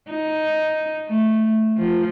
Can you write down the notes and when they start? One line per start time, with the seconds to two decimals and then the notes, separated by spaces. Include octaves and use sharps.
0.10 D#4
1.08 A3
1.78 F3